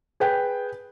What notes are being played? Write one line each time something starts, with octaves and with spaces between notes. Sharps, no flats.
G#4 B4 G5 G#5